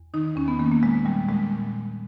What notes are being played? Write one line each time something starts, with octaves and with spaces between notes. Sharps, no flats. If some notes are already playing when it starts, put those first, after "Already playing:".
Already playing: E2
D#3 D#4
E2 C#4
B3
D#3 A#3
A#3
A#2 G#3
A#2 G3
A#2 G#3